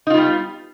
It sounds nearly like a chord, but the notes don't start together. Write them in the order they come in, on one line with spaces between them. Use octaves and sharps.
D#4 F4 B3 G3